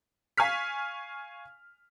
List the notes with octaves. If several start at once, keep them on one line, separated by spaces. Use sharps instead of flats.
F5 G#5 C#6 F6 B6